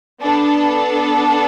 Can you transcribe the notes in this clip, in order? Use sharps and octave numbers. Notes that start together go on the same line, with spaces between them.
B3 D4 A4